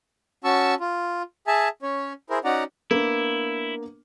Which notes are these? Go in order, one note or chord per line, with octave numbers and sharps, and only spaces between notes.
C#4 F#4 A5 C#6 E6
F4
G#4 E5 G#5 A5
C#4 C#5
E4 G#4 A#4 C5
C#4 D#4 F#4 D5 F#5 A#5
A#3 B3 D4 E4